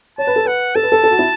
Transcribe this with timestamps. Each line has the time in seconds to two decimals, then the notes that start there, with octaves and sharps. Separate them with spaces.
0.18 C#5 A5
0.27 B4
0.36 A4
0.45 B4 F#5
0.75 A4 A5
0.83 B4
0.92 A4
1.04 A4
1.11 F#4
1.19 E4